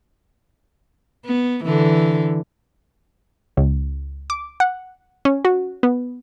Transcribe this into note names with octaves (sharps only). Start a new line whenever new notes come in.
B3
D3 E3
C#2
D6
F#5
C#4
F#4
B3